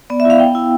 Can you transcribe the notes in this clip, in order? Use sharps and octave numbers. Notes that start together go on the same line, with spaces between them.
B3 D5
E5
E4 F5
B3 G5
E4